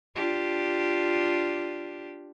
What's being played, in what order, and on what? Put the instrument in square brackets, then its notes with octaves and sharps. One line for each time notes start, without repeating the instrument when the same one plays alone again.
[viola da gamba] D4 F4 G4